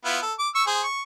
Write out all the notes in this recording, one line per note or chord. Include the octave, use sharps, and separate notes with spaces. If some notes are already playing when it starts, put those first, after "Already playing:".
B3 E4 F4
A4
D6
C#6 E6
G#4 C5
C#6